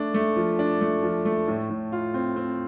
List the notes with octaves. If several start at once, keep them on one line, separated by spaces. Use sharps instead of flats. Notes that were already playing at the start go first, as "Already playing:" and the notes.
Already playing: A3 D4
A3
F3
D4
A3
F3
A3
A2
A2
F4
C4
C4